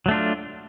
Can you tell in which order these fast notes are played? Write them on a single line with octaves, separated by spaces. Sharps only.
F#3 A3 D4 F4